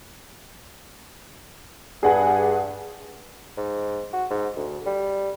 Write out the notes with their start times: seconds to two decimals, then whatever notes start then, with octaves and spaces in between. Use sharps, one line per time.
2.03 G2 G#4 F#5 G#5
3.58 G#2
4.13 F#4
4.30 G#2
4.56 D2
4.86 G3